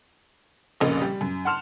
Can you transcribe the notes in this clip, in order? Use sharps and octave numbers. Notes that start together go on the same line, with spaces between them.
F1 A#1 C#3 A#3 D#5
G3
F#2
F#5 A5 C6 F6 E7 F7